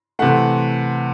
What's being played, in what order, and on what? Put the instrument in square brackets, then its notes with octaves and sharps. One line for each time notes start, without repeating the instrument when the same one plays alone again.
[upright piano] C3 E3 A3 F#5